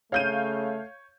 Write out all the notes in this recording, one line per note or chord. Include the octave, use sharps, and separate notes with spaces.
C#3 A3 C#5 F5 G6 D#7